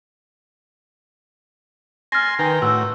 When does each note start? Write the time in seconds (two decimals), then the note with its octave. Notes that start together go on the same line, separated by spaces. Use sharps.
2.12 G#5 C6 F6 A6 A#6
2.39 D#3 B4 G5 G#5 A#5 C6
2.62 A2 F#4 E6